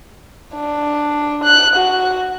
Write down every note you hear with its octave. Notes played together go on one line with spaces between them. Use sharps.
D4
F#6
F#4